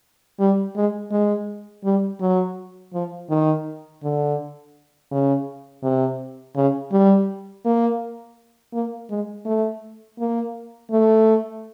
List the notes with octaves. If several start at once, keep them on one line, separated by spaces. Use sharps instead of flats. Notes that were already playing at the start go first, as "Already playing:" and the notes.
G3
G#3
G#3
G3
F#3
F3
D#3
D3
C#3
C3
C#3
G3
A#3
A#3
G#3
A3
A#3
A3